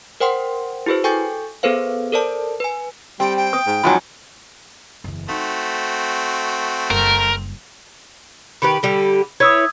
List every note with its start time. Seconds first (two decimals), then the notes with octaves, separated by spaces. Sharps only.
0.20 A#4 C5 F#5 G5 C6
0.86 E4 F#4 G#4 B4 C5
1.04 A4 G5 G#5 C#6 G6 A6
1.63 B3 G#4 A4 B4 C5 F5
2.12 A4 A#4 C5 D5 A5
2.60 B4 G#5
3.20 G3 C4 G5
3.37 G5
3.53 D#6
3.66 G#2
3.83 F2 G#2 F#3 F4 G#5 B5
5.04 F#1 E2
5.29 A3 C4 D#4 F#4
6.90 F#1 G3 A#4
8.62 D#3 G4 B4 B5
8.83 D3 G3 G4
9.40 E4 B4 C#5 D#6 E6 G#6